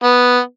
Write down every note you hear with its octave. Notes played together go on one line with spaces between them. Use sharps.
B3